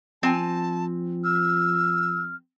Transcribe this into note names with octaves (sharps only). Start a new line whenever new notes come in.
F3 C4 G#5 A5
E6 F6